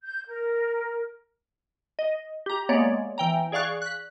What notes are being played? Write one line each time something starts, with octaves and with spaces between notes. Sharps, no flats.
G6
A#4
D#5
G4 A#5
G#3 A#3 B3 C#5 D5
E3 G5 A#5
G#4 D5 F5 C#6 F#6
F#6 B6